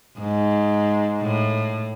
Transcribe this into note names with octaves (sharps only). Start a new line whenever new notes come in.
G#2
A2